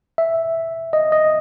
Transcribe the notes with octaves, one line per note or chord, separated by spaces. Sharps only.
E5
D#5
D#5